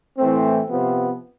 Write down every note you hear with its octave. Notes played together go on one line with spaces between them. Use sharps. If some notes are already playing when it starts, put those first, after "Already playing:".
A2 E3 A3 C4
C3 F3 B3